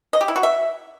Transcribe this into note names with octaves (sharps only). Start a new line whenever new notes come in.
D#5
G4
E4
F#4
E5